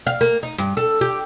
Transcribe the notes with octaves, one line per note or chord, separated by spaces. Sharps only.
F5
A#3
D#4
G2
A4
G4